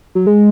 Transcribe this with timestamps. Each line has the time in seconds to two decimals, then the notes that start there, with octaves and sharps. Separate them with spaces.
0.15 F#3
0.27 G#3